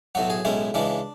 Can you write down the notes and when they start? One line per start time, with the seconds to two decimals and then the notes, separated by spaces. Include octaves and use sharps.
0.15 B1 A2 F#3 F#4
0.30 G#4
0.45 B1 A2 G#3 C#4 E4
0.74 C#2 C#3 E3 G#3 D4